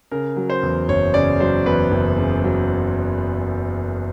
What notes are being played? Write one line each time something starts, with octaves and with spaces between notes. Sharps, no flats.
C#3 A#4
F#3
C5
E2
F#1 C#5
C#3 D5
F#3 C5
E2 B4
F#1
C#3
F#3